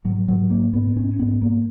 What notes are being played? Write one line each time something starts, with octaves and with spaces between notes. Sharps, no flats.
G#2 F#3
G#2 F#3
G#2 A#3
G#2 B3
G#2 C#4
G#2 B3
G#2 A#3